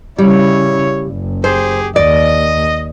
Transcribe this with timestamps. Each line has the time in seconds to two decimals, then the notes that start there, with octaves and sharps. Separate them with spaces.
0.18 C#3 G3 E4 C#5
1.08 F#1
1.44 G4 G#4 C5
1.96 D#2 D5 D#5